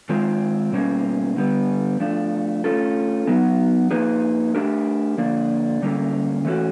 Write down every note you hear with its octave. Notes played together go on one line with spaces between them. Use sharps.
D#3 G#3 C4 F4
B2 G3 A#3 C#4
D3 G3 B3
F3 A3 D4
A3 C#4 F4 A4
F#3 B3 D#4
F3 A#3 D#4 G#4 B4
A3 D4 G4 A#4
D3 F3 A#3 D4
D3 G3 A#3 C#4 E4
E3 A3 C#4 F#4